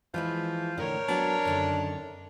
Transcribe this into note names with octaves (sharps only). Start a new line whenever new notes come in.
E3 F3 G#3 E4
A2 D3 A#4 C#5
F#3 B3 C4 D4
F#2 D3 D#3